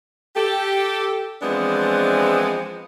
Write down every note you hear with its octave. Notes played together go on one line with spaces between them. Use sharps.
G4 A4
E3 F3 G#3 B3 C4 D4